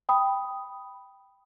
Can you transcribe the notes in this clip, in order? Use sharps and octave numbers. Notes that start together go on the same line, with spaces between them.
G5 B5 D#6